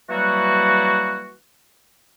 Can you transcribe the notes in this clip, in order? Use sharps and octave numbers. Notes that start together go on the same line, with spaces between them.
E3 F#3 G3 A#3 F#4